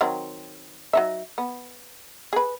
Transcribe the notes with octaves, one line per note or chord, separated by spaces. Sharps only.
D#3 F#3 C4
F#3 D#4 E5
B3
G#4 B4